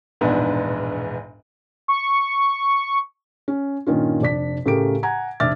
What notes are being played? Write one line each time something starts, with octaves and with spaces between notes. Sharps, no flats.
E1 A#1 G#2 B3 D4
C#6
C#4
G2 A#2 D#3 C#4 F4
F1 D4 D5 B6
A2 C#3 A3 G4 A#4 D7
F#5 G#5 A#5 G#6
F1 D4 E5 D6 F6 A6